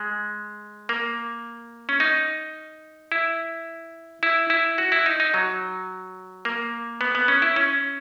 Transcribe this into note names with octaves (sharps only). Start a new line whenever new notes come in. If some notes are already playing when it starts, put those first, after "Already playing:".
Already playing: G#3
A#3
C#4
D#4
E4
E4
E4
F#4
E4
D#4
D#4
F#3
A#3
B3
B3
C#4
E4
C#4